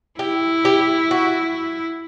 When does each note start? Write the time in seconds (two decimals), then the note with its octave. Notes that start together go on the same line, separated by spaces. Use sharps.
0.19 E4 G4
0.65 G4
1.11 F#4